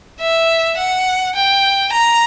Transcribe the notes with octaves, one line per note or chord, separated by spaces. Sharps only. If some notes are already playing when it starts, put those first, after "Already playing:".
E5
F#5
G5
A#5